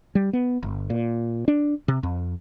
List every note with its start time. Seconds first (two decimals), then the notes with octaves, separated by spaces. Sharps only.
0.15 G3
0.33 B3
0.63 G1
0.90 A#2
1.48 D4
1.88 C3
2.03 F2